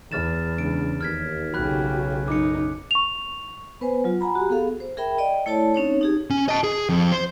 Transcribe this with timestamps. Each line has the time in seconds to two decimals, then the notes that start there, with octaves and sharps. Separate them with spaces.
0.12 E2 F6 A6 E7
0.58 C#3 G#3 D4 D7
1.01 D#2 F6 G#6 B6
1.54 B1 C#3 F#4 G4 B5 F#6
2.28 F#2 D#4 D6 C#7
2.91 C#6 F7
3.81 B3 B4 C5 G#5
4.04 F#3 F4
4.21 F#5 G#5 A#5 B5
4.35 F#4 G4
4.50 B3 G#4 A4 F5
4.80 C5
4.97 G#4 A#4 E5 G5 B5
5.18 D5 D#5 G5
5.46 A3 E4 A4 C#5 D5 A5
5.74 C4 C#4 D#4 C#5
6.01 D#4 G4 G#4
6.30 C#4
6.49 D#5 A5
6.63 G#4
6.89 F2
7.12 C5